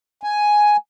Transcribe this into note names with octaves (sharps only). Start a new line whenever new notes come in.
G#5